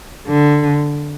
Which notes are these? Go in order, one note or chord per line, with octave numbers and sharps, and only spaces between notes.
D3